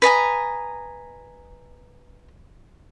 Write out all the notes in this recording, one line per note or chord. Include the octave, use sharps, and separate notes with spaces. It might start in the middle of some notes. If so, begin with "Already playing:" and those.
B4 D#5 G#5 A#5